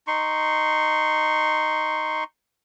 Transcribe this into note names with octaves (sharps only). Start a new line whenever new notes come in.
D#4 C6 C#6